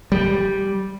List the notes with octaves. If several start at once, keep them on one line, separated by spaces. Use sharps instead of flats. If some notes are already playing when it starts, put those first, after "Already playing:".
G3